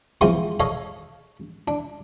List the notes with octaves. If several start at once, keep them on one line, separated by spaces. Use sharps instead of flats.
E3 F3 G#3 B3 C4 C5
A4 C#5 D#5 F5
D4